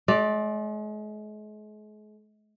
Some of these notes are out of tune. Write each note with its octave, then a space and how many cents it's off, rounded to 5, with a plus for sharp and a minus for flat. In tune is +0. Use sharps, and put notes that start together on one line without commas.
G#3 +40 D5 +0